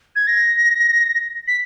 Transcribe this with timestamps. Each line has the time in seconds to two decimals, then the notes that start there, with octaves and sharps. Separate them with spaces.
0.15 G#6
0.27 A#6
1.47 B6